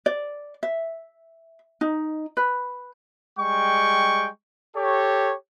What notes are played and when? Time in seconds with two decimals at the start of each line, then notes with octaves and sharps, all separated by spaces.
0.06 D5
0.63 E5
1.81 D#4
2.37 B4
3.39 G3 G#3 G5 C#6
4.76 G4 A4 C#5